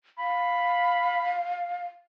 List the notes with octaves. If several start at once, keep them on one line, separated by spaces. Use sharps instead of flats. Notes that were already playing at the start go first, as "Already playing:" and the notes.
F5 B5